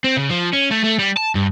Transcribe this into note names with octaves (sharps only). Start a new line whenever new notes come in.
C4
C#3
F3
C#4
A3
A3
G3
A5
G2